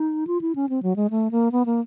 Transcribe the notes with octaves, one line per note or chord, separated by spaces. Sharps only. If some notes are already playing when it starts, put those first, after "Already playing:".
Already playing: D#4
F4
E4
C#4
C4
F#3
G#3
A3
A#3
B3
A#3